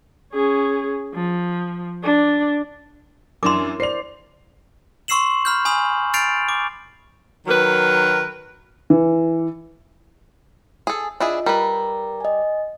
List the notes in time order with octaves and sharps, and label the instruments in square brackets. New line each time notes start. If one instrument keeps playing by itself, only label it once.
[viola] C#4 G#4
F3
D4
[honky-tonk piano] F#2 D4 E7 [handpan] E4 A#4 [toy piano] C6 D6
[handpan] C5 D5 [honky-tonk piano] C7 F7
[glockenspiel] C6 C#6 E6 C7 E7 F#7
B5 F6 G6
G#5 B5 D#6 F#7
F6 G6 A6 C7 D7 F7
D6
[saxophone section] D#3 F#3 A#4 B4
[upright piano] E3
[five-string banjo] G#4 A4
[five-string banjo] D4 E4 G#4 [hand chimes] F4 D#5
[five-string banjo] G3 B4 [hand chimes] A#4 A#5
[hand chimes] D#5 G#5